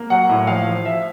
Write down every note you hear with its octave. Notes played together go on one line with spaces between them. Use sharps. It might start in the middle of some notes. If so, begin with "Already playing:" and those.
Already playing: A#3
F#3 F#5
A2
F3 F5
F3
F3 E5